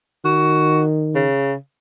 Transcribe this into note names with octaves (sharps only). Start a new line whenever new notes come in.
D#3 F#4
C#3